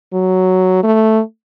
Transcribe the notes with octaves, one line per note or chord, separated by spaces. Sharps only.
F#3
A3